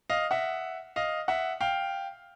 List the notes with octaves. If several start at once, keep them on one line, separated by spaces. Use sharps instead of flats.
D#5 F5
E5 F#5
D#5 F5
E5 F#5
F5 G5